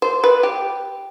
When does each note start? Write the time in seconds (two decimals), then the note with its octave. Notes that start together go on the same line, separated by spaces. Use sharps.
0.02 C5
0.24 B4
0.43 G4